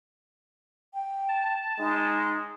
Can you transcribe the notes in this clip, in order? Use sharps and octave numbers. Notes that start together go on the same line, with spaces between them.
G5
A5
G#3 D#4